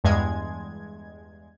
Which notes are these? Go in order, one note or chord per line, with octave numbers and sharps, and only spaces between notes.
E2 G2 G#3 G#6